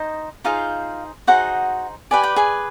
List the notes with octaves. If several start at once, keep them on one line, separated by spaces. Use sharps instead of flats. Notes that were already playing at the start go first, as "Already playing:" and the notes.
Already playing: D#4 C5 D#5
D#4 F4 G#4 C5 F5
D#4 F#4 G#4 C5 F#5
G4 B4 D5 G#5
G5
G#4 G#5